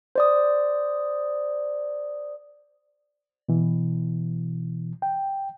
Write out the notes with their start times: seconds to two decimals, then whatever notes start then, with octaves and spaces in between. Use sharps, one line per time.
0.15 C5 D5 D#6
3.49 B2 E3
5.02 G5